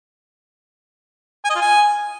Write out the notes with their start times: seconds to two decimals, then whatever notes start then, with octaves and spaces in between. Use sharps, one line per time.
1.44 G#5
1.50 D#5
1.55 F4
1.61 G#5